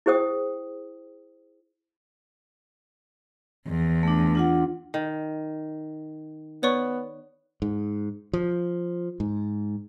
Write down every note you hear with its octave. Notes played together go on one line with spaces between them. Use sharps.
E4 G#4 C5 G5 D#6
E2
A3 D4
D4 F4 F#5
D#3
B3 C#5 D5 C#6
G#2
F3
G#2